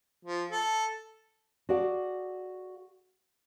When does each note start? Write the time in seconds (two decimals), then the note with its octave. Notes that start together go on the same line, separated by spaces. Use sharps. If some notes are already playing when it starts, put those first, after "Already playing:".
0.25 F3
0.51 A4
1.69 F#4 G#4 A4 D5 F5 F#5